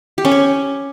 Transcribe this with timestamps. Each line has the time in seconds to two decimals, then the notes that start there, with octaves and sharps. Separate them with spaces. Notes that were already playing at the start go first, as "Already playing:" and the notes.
0.18 G4
0.25 C#4
0.31 C#5